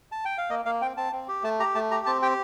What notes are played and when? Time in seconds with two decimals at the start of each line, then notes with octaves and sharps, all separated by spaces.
0.12 A5
0.25 G5
0.38 F5
0.50 A#3 D#5
0.65 A#3 F5
0.81 C4 G5
0.97 C4 A5
1.13 C4
1.28 G4
1.43 A3 A5
1.60 G4 A#5
1.75 A3 A5
1.91 G4 A#5
2.06 C4 A5
2.22 G4 G5